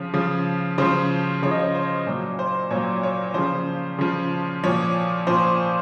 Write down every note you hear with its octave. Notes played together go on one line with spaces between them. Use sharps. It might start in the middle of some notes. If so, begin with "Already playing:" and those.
Already playing: C#3 F3
C#3 F3
C#3 F3 C5
C#3 F3 C#5
D#5
C#5
C5
A#2 F#3
C5
A#2 F#3 C#5
C#5
C#3 F3 C5
C#3 F3
A#2 F3 C#5
A#2 F3 C5